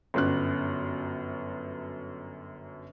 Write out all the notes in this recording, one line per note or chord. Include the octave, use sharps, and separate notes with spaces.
G1 F#2 F#6